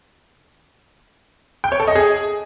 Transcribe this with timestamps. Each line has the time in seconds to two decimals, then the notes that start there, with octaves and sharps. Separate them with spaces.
1.64 G5
1.72 C#5
1.80 A4
1.88 D#5
1.95 G#4